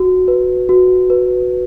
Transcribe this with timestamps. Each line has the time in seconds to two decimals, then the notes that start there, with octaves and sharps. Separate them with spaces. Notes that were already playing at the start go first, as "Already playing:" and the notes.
Already playing: F#4
0.28 B4
0.69 F#4
1.10 B4